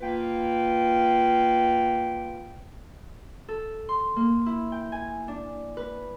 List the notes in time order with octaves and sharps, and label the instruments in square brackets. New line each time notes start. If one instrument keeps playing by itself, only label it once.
[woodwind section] A#3 F4 B4 G5
[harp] A4
C6
A#3
E4
G5
G#5
D4
B4